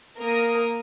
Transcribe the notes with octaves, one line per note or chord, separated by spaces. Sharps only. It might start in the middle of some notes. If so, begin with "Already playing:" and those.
A#3 A#4 D#6